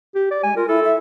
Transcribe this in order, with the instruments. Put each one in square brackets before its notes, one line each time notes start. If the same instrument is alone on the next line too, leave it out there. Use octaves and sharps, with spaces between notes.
[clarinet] G4
D5
[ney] G#3 [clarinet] G#5
[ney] F4 [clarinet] A#4
[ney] E4 [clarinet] A4
[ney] E5